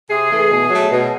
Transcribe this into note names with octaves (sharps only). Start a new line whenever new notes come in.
C3 G#4
E3 A3
B2
F#3 A3
B2